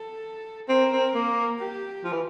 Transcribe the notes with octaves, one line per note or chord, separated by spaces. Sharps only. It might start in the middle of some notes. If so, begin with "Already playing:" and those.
Already playing: A4
C4 A#4
C4
A#3
G4
F3
E3